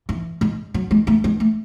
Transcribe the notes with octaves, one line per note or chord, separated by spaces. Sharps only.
E3
G#3
F#3
G#3
A3
G#3
A3